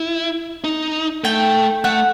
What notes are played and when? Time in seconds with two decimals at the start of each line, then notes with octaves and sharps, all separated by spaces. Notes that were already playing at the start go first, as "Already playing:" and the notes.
Already playing: E4
0.64 D#4
1.24 A3 G5
1.84 A3 F#5